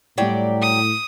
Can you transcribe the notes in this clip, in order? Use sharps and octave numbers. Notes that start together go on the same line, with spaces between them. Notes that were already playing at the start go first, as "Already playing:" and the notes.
A2 F#3 G3 E4 G4 D5
D#6